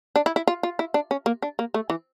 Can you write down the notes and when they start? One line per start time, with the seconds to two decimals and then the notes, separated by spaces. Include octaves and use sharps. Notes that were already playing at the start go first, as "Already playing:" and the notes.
0.16 D4
0.26 E4
0.36 E4
0.47 F4
0.63 F4
0.79 E4
0.94 D4
1.11 C#4
1.26 A#3
1.42 D4
1.59 A#3
1.74 A3
1.90 E3